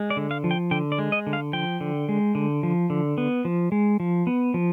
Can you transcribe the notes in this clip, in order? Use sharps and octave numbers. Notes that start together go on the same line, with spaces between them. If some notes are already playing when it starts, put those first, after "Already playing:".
Already playing: G#3
D5
D3
F5
F3
G5
D3 G5
D5
G#3
D#5
D3
F5
F3 G5
D3
G#3
D3
F3
D3
B3
F3
G#3
F3
B3
F3